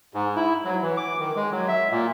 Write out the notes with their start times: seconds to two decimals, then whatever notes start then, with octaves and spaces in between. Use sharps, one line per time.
0.14 G#2
0.36 E4
0.65 F#3
0.81 E3
0.97 D6
1.19 D#3
1.36 G#3
1.51 F#3
1.68 E5
1.91 A#2